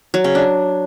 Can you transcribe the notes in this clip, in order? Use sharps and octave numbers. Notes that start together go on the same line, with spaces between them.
F#3
C#3
D4